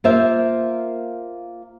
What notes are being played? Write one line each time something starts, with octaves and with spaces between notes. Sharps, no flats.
A#3 F4 A#4 C5 E5